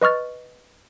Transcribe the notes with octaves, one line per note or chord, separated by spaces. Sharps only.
B4 D#5 C#6 F6 A6